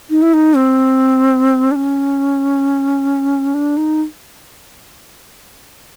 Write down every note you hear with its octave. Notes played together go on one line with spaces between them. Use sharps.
D#4
E4
D#4
C4
D4
C#4
D4
D#4